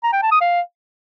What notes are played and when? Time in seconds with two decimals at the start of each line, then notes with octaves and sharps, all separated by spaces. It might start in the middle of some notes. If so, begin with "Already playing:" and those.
0.03 A#5
0.13 G5
0.22 A5
0.32 D#6
0.41 F5